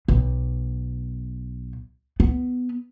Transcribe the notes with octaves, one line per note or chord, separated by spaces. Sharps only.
B1
B3